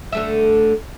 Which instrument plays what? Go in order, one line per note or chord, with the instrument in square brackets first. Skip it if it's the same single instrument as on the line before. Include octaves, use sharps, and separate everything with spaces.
[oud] D3 A3 E5